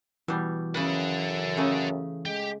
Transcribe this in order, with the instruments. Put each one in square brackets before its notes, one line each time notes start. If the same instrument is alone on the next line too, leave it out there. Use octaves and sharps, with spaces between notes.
[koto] B2 G3 [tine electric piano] E3
[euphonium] F#2 [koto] C#3 B4 [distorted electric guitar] A4 F#5
[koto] C#3 A3 C#4
[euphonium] G#3 [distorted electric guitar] G4